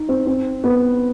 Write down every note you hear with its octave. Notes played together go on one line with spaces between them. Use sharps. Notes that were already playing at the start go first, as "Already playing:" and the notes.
Already playing: D#4
C4
C4
B3